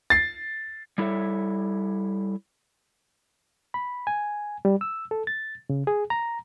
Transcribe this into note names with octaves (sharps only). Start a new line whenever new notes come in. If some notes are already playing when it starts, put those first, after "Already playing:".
A6 C7
G3 E4 A4 C#5 E5
B5
G#5
G3
E6
A4
A6
C#3
G#4
A#5